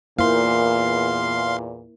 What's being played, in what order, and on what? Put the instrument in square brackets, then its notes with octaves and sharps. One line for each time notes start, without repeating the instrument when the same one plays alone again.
[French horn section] E2 A#2 [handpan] A#3 E4 C5 [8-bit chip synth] F5 C6